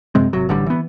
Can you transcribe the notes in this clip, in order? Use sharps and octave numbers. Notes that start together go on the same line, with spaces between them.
F#2 C3 G#3 C4
G#1 C3 F#3
A1 D3 G3
E3 B3